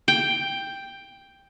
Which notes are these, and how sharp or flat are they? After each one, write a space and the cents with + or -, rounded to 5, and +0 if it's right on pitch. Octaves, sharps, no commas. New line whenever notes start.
G5 +5